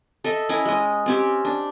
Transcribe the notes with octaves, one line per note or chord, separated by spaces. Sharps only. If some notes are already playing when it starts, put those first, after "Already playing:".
A4 D#5 E5
C#4 E4 A#4 D#5
G#3 D#5
C4 C#4 G4
D4